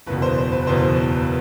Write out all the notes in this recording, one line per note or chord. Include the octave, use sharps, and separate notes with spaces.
F#1 E2 B2 B4
C5
C5
B4
F#1 E2 B2 C5
B4